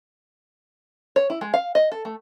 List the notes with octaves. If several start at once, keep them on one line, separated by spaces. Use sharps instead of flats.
C#5
E4
G#3
F5
D#5
A4
A3